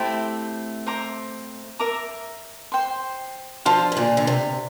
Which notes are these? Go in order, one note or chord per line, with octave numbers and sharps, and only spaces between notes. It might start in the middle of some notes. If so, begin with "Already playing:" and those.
Already playing: A3 C4 E4 G4 C5
C5 E5 A#5 D6
A#4 E5 A#5 D6
C5 G5 C6
D3 F3 C5 F5 A5 C6
C3
A#2 D3
D3
C3